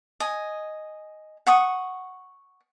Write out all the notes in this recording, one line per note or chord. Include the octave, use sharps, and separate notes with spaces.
D#5 G#5
F#5 C#6 D#6